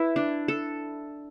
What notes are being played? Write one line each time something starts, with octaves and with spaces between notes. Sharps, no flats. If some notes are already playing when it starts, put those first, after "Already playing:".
Already playing: E4 B4
D4
A4